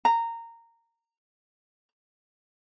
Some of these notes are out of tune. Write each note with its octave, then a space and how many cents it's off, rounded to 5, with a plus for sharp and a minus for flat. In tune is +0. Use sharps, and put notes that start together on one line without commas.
A#5 -15